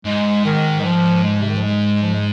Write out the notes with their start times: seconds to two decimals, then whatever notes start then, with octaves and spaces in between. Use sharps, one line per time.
0.05 G#2 G#3
0.45 D#3
0.80 G#3
0.84 F3
1.24 G#3
1.41 C3
1.49 D#3
1.56 F3
1.63 G#3
2.02 F3
2.14 G#3